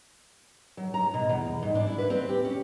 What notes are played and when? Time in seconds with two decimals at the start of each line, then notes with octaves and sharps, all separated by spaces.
0.77 F#3
0.94 A#5
1.14 B2
1.29 E2
1.63 G#2
1.75 D4
1.87 E4
1.98 B4
2.10 C4
2.29 G4
2.45 C#4